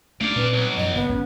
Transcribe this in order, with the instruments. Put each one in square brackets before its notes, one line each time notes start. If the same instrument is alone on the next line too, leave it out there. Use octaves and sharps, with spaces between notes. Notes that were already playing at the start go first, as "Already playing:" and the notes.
[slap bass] A3 C4 D4 [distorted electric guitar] D5 F5
[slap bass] A#2 G3 C4 [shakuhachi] B4
[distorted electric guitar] B1
[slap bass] F#2 F3 [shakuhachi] D#5
[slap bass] G1 C3 [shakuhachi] B3
[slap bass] G1 C#4